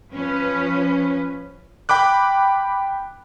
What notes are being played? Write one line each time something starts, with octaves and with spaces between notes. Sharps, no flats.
F3 C#4 B4
G5 B5 D6 F#6